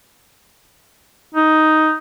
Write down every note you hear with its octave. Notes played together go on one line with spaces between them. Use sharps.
D#4